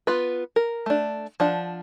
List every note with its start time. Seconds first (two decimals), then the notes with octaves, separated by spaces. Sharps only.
0.07 B3 F4 B4
0.56 A#4
0.86 A3 D4
1.40 F3 D4 F#5